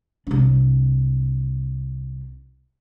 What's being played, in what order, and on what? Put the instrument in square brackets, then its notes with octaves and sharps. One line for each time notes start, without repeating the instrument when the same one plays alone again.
[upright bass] C2 D4